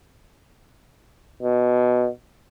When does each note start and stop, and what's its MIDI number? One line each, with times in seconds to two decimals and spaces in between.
1.42 2.08 47